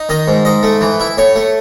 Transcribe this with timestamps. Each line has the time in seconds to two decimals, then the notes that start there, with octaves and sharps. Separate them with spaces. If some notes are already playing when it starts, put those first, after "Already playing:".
Already playing: D#4
0.09 D#3 D#5
0.28 G#2
0.45 G#2 D#5
0.63 A3
0.81 E3
1.00 E4
1.17 A2 C#5
1.36 A3